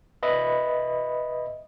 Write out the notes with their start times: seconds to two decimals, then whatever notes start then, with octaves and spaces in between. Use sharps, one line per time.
0.23 B4 D#5 E5 B5